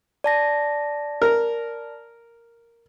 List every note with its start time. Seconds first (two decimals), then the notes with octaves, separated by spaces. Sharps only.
0.24 D5 A5 A#6
1.22 A#4